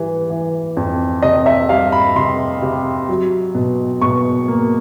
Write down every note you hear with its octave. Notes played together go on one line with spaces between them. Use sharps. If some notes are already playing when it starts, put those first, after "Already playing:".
Already playing: E3 G3
E3
F2
C3 D#5
E5
G3 F5
B5
C3 C6
C3
F#3
B2
B2 C#6
A#3